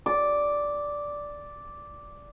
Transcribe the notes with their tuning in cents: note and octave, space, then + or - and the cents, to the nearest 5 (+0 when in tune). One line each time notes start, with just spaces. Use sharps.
D5 -5